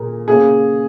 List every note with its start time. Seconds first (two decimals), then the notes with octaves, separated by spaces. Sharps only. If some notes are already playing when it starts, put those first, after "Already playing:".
Already playing: A#2 G#4 A#4
0.28 C#3 A#3 C#4 G#4